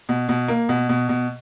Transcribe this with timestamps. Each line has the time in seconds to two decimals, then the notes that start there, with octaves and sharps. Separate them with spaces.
0.09 B2
0.29 B2
0.48 A#3
0.69 B2
0.89 B2
1.09 B2